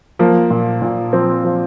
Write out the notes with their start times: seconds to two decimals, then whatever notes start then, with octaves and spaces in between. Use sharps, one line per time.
0.19 F3 A#3
0.51 A#2
0.82 A#2
1.13 F3 C4
1.44 F3